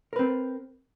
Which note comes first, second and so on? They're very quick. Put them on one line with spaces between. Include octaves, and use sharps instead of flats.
A#4 B4 C4